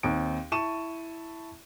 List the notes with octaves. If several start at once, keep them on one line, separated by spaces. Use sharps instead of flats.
D#2 C4 D7
E4 A5 C#6 D#7 E7